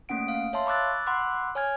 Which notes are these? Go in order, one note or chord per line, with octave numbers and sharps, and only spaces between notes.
A3 A#3 C#4 F#5 D7
F5
C#5 E5 F5 A5 C6
B5 C#6 D6 E6 F#6 A6
F#5 B5 C6 D6 E6 F#6
C#5 G#5 F6 G#6